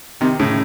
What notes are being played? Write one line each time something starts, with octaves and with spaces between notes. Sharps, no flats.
C3 D#3
A2 C#3